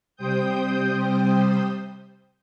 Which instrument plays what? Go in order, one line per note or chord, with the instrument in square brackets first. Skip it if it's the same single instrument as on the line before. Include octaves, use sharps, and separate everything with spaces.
[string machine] C3 G3 C5 G5 D#6 G6